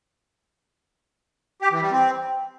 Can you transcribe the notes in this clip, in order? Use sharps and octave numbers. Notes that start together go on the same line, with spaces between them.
G4
E3
G3
C4